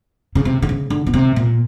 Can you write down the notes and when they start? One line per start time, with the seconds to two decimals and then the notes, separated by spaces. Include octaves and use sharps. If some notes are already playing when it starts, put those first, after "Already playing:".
0.35 C#3
0.45 C3
0.62 D3
0.69 C#3
0.90 D3
1.07 B2
1.14 C3
1.36 A#2